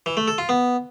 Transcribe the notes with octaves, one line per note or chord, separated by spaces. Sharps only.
E3
A3
A4
F4
B3